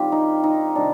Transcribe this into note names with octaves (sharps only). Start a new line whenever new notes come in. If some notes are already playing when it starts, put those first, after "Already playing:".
Already playing: D#3 G3 C4 F4 G4
D#4
D#4
C3 D#3 G3 D4